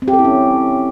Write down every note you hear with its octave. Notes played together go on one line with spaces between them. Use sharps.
C4
G4
A4
E4
C#4